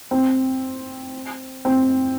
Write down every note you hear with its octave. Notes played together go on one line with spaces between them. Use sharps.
C4
C4